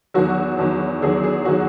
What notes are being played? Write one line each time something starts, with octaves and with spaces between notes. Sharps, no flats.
E2 D#3 F#3 F#4
E2 D#3 F#3
E2 D#3 F#3 G#4
G#4
D#3 F#3 F#4